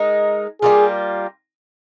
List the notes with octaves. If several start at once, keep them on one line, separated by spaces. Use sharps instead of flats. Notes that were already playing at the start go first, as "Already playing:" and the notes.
Already playing: G#3 D#4 A#4
G3 A#3 F4 G#4